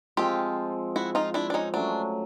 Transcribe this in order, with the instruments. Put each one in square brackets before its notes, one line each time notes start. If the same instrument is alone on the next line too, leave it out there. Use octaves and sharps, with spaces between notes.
[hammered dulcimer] F3 G#3 C4 [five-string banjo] F4 G4
[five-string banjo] E4 F#4
D#4 F4
D4 E4
D4
C#4 D#4
[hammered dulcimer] F#3 A3 C#4 [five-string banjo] D4